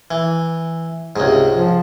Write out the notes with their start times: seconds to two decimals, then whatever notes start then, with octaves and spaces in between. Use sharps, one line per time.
0.11 E3
1.16 C#2 G#2 C3
1.53 F3